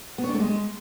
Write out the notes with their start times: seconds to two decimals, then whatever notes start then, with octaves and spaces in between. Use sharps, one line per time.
0.18 B3
0.24 C#5
0.29 D4
0.35 A3
0.40 G#3